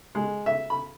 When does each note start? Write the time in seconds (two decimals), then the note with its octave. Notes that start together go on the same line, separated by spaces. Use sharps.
0.15 G#3
0.46 E5
0.70 B5